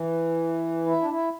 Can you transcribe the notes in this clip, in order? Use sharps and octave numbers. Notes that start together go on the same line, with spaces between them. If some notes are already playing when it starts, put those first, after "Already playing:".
Already playing: E3
E4
D4
E4